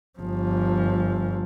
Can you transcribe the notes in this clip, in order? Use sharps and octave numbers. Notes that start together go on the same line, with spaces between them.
G1 F3